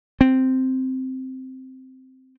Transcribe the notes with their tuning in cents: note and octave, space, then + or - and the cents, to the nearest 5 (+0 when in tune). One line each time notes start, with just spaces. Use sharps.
C4 -5